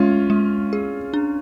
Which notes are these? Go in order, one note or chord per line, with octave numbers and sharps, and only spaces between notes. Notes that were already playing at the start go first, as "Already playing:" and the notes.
Already playing: G#3 C#4 F4
G#3
G#4
D4